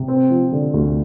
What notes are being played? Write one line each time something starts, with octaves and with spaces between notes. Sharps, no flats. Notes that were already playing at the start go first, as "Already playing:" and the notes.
Already playing: C3
C4
F3
D3
D2